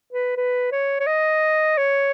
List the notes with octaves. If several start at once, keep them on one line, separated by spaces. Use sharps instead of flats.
B4
B4
C#5
C#5
D#5
C#5